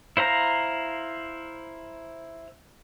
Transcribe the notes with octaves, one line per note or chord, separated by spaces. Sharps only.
E4 C5 F5 A#5